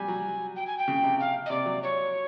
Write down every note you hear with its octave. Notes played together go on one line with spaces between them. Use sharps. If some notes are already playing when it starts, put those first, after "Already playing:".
Already playing: G3 G#5
F#3
G5
G#5
G5
C#3
C3
F5
D#5
C3 D5
F#3
C#5